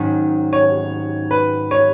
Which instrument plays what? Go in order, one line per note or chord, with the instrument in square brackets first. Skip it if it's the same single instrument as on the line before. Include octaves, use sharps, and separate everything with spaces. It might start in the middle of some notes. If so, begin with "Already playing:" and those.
Already playing: [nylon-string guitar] G#2 D#3 F#3 C#4
[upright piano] C#5
B4
C#5